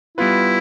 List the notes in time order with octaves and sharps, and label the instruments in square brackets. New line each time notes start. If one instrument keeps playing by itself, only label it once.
[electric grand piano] G3 B3 F4 B4 [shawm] E4